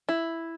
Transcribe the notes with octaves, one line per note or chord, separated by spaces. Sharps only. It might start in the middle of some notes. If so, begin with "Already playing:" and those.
E4